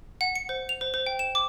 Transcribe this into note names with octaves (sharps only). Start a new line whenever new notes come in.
F#5
C#7
C5
F7
C5
C5
G5
E7
D6